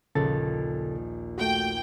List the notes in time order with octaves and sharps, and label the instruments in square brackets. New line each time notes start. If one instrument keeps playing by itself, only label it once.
[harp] A#1 D#2 [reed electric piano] C#3 A4 A6
[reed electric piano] A3 F#4 [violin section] G5